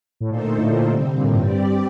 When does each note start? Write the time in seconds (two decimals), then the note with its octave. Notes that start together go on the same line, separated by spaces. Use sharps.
0.20 A2
0.30 A#2 D3 A3 D#4 A4 C5
0.44 A#2
0.58 A2
0.72 A#2
0.86 A#2 D3 G3 C4
1.00 C3
1.15 A#2
1.24 A2
1.33 G2
1.43 G3 C4 G4 D5